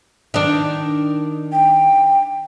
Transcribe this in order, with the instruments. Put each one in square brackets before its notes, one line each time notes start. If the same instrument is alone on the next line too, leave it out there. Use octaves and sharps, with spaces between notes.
[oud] D#3 D4
[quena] G5